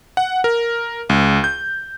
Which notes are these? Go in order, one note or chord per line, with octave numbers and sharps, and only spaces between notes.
F#5
A#4
C#2
G6